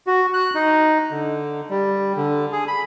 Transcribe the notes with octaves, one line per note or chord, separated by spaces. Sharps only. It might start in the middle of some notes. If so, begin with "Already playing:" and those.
F#4
F#6
D#4
D3
G3
D3
G#4
B5